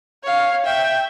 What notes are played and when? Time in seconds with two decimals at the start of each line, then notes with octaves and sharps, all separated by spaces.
0.23 C#5 F5
0.64 E5 G5